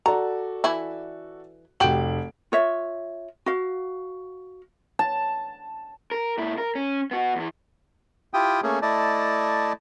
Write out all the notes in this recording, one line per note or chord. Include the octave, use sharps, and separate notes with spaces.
F#4 A4 D5 A#5
E3 E4
F1 F#4 G4 D7 F#7
F4 C#5 E5
F#4 F5
A5
A#4
A#2 E4
A#4
C#4
B3 F#4
E2 E3
E4 F4 G4 G5 D#6
A3 A#3 C#4 G#4
A3 E4 D5 D#5 A5